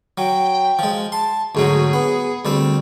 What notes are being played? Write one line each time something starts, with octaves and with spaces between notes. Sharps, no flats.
F#3 G5
F3 G#3
A5 C6
D2 G#2 F#3 G#4
B3
D2 G3 C4